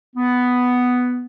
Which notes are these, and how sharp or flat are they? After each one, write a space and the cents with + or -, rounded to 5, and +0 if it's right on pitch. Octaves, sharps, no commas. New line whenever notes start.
B3 +5